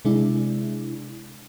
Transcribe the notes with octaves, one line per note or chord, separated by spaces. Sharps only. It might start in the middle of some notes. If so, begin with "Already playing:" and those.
C3 G#3 D4 E4